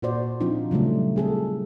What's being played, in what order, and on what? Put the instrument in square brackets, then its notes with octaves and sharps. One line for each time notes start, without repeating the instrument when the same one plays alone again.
[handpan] A#2 F#4 C5 D5
F3 C4 D4 D#4 F4
C#3 F#3 G3 A3
C4 G#4 A4